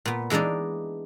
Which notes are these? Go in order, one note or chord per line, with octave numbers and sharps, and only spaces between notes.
A#2 B3
E3 G#3 D4 D#4 D5